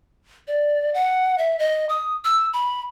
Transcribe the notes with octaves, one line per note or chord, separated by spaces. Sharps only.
D5
F#5
E5
D#5
D#6
E6
B5